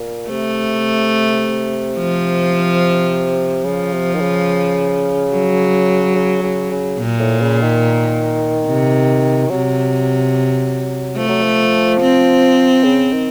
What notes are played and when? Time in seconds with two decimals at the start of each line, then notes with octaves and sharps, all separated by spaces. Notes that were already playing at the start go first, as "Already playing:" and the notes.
Already playing: A#2
0.29 C3 A3
1.97 F3
3.64 C#3 F3
3.92 C3
4.14 D#3
4.20 C#3
5.31 F#3
6.15 C#3
6.43 C#3
6.71 C#3
6.99 A#2
7.19 A2
7.41 C#3
7.62 D#3
8.67 C3
9.49 C3 F#3
11.17 F3 A3
11.29 F#3
11.41 F3
12.01 C4
12.84 C#3
13.12 D#3